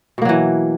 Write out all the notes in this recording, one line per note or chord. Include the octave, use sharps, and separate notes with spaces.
B2 E3 F#3 A#3